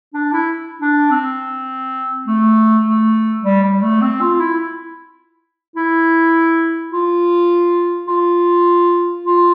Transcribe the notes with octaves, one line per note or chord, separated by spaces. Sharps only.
D4
E4
D4
C4
A3
A3
G3
G3
A3
C4
F4
E4
E4
F4
F4
F4